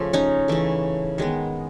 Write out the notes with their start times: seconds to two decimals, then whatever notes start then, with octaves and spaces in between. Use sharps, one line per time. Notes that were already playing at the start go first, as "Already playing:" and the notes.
Already playing: C#3 F3 A3
0.13 C#4 D#4
0.48 C#3 E3 A3
1.18 D#3 G#3 B3